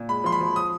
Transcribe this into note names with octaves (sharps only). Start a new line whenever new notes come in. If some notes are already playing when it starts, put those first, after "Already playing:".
Already playing: A#2
G#3 B5
F3 C6
B5
F3
D#6